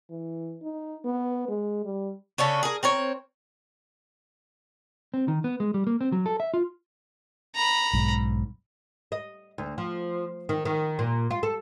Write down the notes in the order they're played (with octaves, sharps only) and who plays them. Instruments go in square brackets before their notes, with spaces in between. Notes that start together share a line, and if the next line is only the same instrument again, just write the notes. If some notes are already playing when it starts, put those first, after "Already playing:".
[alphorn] E3
D#4
B3
G#3
G3
[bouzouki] C#3 C#4 D4 A4
G#4 A#4
C4 A#4 C#5
[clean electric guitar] C4
D#3
B3
G#3
G3
A#3
C4
F#3
A4
E5
F4
[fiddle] A#5 B5
[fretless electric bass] B1 G#2
[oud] D#5
D2
F3
D#3
D#3
A#2
F4
A4